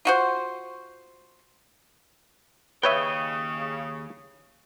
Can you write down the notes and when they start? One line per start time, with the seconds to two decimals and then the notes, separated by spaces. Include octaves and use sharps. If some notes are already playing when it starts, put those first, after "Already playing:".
0.05 F4 F#4 C5
2.83 D#2 C#3 B4 C#5 D#5 E5 G5